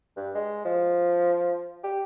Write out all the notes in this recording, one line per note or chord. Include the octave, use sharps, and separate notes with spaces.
G2
G#3
F3
G4